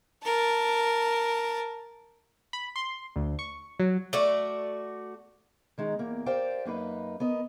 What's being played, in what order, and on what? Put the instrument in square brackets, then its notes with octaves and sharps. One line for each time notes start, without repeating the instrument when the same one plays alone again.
[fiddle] A#4 A5
[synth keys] B5
C6
D2
C#6
F#3
[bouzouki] A3 F#4 D5
[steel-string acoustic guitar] D#3 G#3 D#4
E2 A#3 A#4
G4 A#4 C5 D5 F5 G5
F#2 A#3 D#4 B4
B3 A#4 D#5